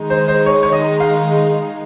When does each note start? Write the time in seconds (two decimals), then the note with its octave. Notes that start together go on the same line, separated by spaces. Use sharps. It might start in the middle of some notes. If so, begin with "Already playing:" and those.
Already playing: D#3 G#3 D#4
0.10 C5
0.28 C5
0.46 C#5
0.63 C#5
0.73 D#5
1.00 F5